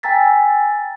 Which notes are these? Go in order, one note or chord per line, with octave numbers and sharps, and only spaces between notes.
G5 G#5 A#5 E6 A6 B6